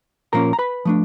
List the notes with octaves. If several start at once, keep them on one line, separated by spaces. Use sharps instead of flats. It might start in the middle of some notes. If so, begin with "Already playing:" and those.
A#2 F3 A#3 C#4 A#4 A#5
A#5
B4 B5
F3 A3 D4